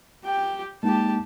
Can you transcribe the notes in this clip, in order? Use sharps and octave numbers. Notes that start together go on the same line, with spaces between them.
G4 G5
G#3 A#3 D#4 G4 A5